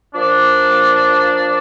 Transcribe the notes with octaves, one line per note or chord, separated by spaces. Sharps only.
F3 A#3 D4